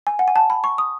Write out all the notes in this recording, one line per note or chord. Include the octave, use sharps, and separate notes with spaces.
G#5
F#5
G#5
A5
B5
C#6
D#6